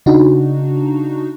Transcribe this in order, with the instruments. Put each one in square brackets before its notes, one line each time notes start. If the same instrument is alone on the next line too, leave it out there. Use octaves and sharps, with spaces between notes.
[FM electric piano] C#3 D4 D#4 F#4